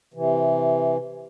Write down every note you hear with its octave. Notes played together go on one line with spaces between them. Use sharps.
C3 E3